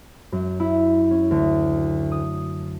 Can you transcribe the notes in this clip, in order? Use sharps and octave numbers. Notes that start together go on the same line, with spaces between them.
F#2
E4
C#4
D2
D#6